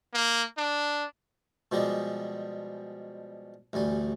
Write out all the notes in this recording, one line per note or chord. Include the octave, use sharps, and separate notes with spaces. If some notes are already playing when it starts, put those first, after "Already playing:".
A#3
D4
B2 F3 G3 G#3 G4 G#4
A1 D2 G3 G#5